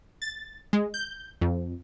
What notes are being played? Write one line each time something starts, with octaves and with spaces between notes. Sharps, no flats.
A6
G#3
G6
F2